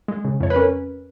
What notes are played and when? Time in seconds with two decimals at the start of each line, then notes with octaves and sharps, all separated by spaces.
0.08 G#3
0.25 C#3
0.40 F2 C#5
0.50 B4
0.56 C#4 A#4